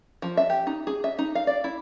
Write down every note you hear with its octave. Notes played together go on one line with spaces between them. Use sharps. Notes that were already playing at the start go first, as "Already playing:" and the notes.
F3
E5
G4
D#4
G#4
E5
D#4
F5
D5
E4